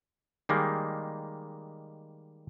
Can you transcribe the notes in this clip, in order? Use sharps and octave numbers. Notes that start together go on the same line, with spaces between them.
D#3 G3 G#3 A#3